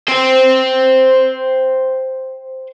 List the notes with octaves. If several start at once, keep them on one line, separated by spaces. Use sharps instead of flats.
C5 G5